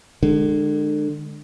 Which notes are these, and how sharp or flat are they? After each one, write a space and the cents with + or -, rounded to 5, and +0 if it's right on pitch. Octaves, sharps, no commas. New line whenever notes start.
D3 +35 G#3 +0